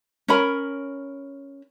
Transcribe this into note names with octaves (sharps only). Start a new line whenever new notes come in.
C#4 A#4 B5